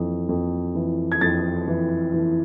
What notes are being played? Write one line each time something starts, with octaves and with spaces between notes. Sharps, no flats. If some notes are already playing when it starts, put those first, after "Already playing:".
Already playing: F2 E3
F2
E3
G#6
F2 A6
E3
E3